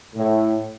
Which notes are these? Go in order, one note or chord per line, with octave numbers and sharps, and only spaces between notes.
A2